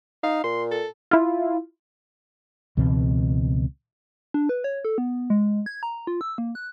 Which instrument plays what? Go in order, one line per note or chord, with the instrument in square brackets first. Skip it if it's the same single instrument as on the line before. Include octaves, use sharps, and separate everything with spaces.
[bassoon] D#4 [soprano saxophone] F5
[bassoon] A#2 [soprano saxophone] C6
[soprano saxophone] A4
[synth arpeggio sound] E4 F4
[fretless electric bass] C#2 B2 E3 C4
[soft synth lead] D4
B4
C#5
A4
B3
G#3
G#6
A#5
F4
E6
A#3
F#6